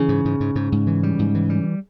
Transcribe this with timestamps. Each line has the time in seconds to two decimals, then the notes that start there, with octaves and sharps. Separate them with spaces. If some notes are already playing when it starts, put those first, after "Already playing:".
Already playing: C#3 E3
0.09 G#2
0.25 G#2
0.40 G#2
0.55 G#2
0.72 G#2
0.87 E3
1.03 G3
1.19 G#2
1.35 E3
1.50 G3